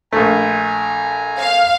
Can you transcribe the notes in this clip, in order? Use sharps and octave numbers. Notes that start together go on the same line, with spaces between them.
A#1 A3 G#5 A#5
F5